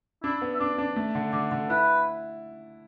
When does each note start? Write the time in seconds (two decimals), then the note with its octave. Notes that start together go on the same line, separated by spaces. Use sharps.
0.23 D4 E4
0.42 B3
0.55 E5
0.60 D4 D5
0.78 D4
0.96 A3
1.15 D3
1.33 D3 D5
1.51 D3
1.70 E4 B4